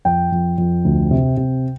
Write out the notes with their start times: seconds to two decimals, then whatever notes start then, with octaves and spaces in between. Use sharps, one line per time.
0.05 F2 G5
0.32 F2
0.58 F2
0.85 D2
1.11 C3
1.37 C3